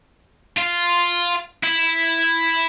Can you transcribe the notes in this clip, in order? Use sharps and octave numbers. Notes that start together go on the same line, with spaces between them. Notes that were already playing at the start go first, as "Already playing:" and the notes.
F4
E4